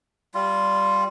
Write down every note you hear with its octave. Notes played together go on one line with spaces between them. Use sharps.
G3 F4